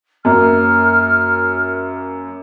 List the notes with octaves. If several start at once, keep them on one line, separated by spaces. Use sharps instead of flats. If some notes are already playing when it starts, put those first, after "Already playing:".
F#2 A#3 F6